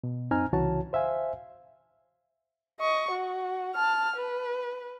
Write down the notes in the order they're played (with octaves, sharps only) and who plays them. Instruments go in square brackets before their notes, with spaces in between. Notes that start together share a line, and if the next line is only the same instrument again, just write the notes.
[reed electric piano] B2
F#2 C4 D#4 G#5 A#5 F6
C2 C#3 E3 F#4 C#5 A5
C5 E5 F5 G#5
[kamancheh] D#5 C#6
F#4
A5 F6
B4